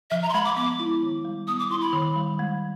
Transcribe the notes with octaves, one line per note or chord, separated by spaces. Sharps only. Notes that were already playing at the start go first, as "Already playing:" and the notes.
F3 E5
A#5
C6
G#3 B5
D6
B3 D6
E4
D#3
G3
B3 D#6
D6
E4 C6
B5
D#3
G3
G#3